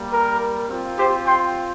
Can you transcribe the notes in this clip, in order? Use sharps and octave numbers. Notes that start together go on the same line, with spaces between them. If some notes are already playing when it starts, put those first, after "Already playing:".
Already playing: G3 A#3
A#4
C4 F4
G4 C5
G5 C6